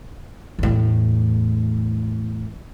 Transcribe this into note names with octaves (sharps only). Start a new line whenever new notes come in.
E2 A2